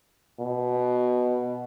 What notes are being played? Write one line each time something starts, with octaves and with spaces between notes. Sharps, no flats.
B2